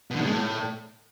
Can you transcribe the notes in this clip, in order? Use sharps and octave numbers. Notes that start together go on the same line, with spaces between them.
B2
D3
B2
G#3
A2